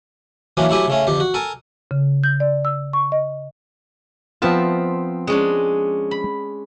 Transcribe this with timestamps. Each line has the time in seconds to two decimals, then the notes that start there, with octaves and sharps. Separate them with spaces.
0.57 E3 F#3 A#3 C#4 D4
0.69 F#3 A3 E4 G4 G#5
0.88 C#3 A3 C#4
1.07 F2 D3 G4
1.20 F#4
1.34 A4 A#4 G#5
1.91 C#3
2.24 G6
2.40 D5
2.65 E6
2.93 C#6
3.12 D#5
4.42 F3 B3 C4 F4 E5 A5
5.27 G#3 C#4 D4
6.11 B5